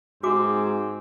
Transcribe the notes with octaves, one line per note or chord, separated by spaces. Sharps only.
G#2 C4 F#4 G#5 D6